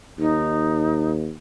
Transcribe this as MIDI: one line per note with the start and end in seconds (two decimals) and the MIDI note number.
0.18 1.32 39
0.18 1.11 63